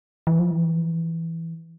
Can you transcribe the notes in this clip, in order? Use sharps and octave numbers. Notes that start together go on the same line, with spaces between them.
E3
F3
E3